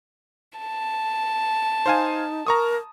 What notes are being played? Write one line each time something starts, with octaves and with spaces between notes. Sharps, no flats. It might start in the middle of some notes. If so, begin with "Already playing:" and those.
A5
D#4 C5 F5 G#5
A#4 A#5 C#6 D#6